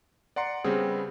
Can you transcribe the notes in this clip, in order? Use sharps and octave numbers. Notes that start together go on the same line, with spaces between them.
D5 F#5 A#5 C6 C#7
C#3 G3 B3 C4 G#4